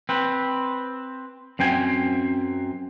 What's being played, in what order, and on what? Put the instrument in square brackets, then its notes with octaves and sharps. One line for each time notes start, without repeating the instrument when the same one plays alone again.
[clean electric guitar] C4 B4
F#2 C4 G5 G#5